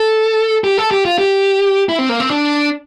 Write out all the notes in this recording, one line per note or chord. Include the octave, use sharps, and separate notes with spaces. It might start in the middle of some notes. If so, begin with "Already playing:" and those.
Already playing: A4
G4
A4
G4
F4
G4
E4
C4
A#3
C4
D4